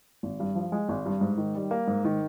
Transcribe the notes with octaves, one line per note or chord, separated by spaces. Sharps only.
G#1
G2
F3
G#3
G#1
G2
G#2
D#3
G3
A#3
G#2
D#3